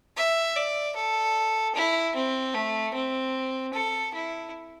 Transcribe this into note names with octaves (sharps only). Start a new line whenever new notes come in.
E5
D5
A4
E4
C4
A3
C4
A4
E4